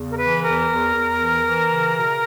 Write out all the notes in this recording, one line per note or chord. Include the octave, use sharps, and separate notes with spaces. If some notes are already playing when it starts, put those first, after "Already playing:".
Already playing: E2 C#3
A#4
E3 B4
E2 A#4
E2
E2
E3
E3
C#3
B2